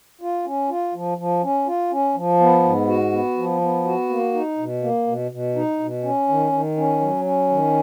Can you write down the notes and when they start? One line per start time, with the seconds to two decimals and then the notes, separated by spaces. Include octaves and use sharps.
0.21 F4
0.46 C#4
0.70 F4
0.94 F3
1.18 F3
1.43 C#4
1.67 F4
1.91 C#4
2.15 F3
2.40 B3
2.64 G#2
2.88 F#4
3.12 B3
3.37 F3
3.61 B3
3.85 F#4
4.09 A#3
4.34 D#4
4.58 B2
4.83 A#3
5.07 B2
5.31 B2
5.56 D#4
5.80 B2
6.03 C#4
6.29 D#3
6.52 D#3
6.77 C#4
7.00 F#3
7.25 C#4
7.50 D#3